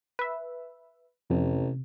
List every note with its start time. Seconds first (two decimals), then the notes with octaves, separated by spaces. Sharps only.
0.19 B4 E5
1.30 A1 F2 C3